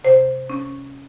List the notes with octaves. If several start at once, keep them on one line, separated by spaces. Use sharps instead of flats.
C3 C5
C#4